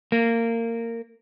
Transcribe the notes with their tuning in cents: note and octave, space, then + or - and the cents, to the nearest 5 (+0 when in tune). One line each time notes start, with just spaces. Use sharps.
A#3 -20